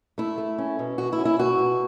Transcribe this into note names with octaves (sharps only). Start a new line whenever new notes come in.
A3 E4
A3
C#4
B2
B2 F#4
E4
C#4
E4
B2 F#4
B2